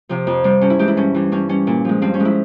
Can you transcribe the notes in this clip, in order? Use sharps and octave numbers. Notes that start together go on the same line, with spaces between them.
C3 F3
F2
C3 G3
G2 C#4
E4
E3 G#3 G4
E4
G2 C#4
E3 G3
G2 C#4
G3 C#4
A#2
F3 G#3
G2 C4
C#4
F3 G#3
E4